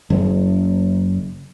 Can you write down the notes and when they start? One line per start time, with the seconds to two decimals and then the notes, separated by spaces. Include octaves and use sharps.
0.10 F#1